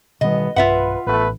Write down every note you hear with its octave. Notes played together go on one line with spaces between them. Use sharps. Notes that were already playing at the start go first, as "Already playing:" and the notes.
A1 B2 D#3 G3 B3 D#5
B1 G2 F4 B4 E5 F#5
A1 A3 B3 B4